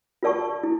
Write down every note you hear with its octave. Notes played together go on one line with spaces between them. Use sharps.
F4 A#4 D5 A5 C#6
E4